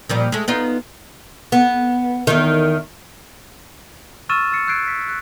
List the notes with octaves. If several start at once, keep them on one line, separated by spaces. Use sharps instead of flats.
A#2 F3 G3
G#3 A3
B3 D#4 F4
B3
E2 D#3
C#6 E6 F6 A6 D#7 E7
E6 A6 C7 C#7
E6 F#6 G#6 C7 D7
B6
F#6